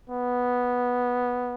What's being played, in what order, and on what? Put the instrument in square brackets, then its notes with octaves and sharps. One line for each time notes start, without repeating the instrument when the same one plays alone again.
[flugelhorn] B3